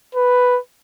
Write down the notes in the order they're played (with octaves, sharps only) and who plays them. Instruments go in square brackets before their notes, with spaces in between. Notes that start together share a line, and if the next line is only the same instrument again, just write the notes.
[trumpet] B4